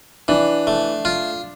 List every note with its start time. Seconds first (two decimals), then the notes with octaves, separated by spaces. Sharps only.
0.28 E3 D4
0.67 A3
1.05 F4